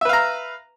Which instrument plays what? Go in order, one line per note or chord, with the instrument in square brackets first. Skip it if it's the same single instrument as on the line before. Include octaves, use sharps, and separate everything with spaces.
[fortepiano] E5
B4
F5
A#5